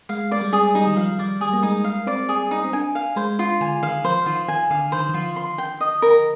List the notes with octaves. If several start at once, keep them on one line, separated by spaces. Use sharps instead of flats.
G#3 F5
G#3 D5
G3
G#4
G3 D#4
D#3
F3 F5
G3 D5
G3 G#4
A#3
G#3 D#4
F5
C4 D5
G#4
D#4
C4
D4 G#5
F5
G#3 C5
F4
D3 G#5
D#3 F5
F3 C5
D#3 F4
D#3 G#5
D3 F5
D#3 C5
D#3
F3 F4
C6
G5
D#5
A#4